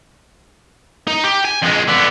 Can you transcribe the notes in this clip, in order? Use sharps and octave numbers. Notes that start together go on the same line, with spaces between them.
D#4
G4
G#5
F2 G#3
D3 B3